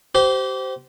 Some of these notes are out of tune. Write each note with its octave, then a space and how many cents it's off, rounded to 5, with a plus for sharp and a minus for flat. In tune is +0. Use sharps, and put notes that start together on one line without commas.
G4 -30 C5 -10